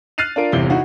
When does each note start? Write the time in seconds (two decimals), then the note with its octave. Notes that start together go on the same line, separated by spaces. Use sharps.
0.18 F6 F#6 A6 C7 D#7 F7
0.36 D4 F4 A#4 D7
0.52 G1 E2 C3 E4 G7
0.70 D#4 E4 F#4